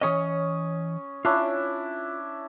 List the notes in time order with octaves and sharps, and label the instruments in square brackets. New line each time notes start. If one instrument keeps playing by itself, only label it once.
[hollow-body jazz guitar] E3 C#5 D#5 [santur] C#4 D#6
[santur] C#4 D4 E4 [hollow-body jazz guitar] F4